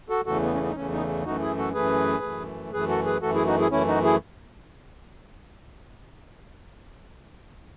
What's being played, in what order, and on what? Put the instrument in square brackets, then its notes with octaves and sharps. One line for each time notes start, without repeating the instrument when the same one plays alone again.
[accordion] F#4 A4
E2 C#3 E3 A3 F#4 A4
B3
C#4
B3
D#4
E2 C#3 E3 A3 C#4
B3 D#4
F#2 E3 A3 D#4 F#4
E4 G#4
F#4 A4
F#2 E3 A3 G#4 B4
F#2 E3 A3
F#2 E3 A3 G#4 B4
F#4 A4
G#4 B4
F#2 E3 A3 F#4 A4
E4 G#4
D#4 F#4
E4 G#4
F#2 E3 A3 C#4 E4
D#4 F#4
E4 G#4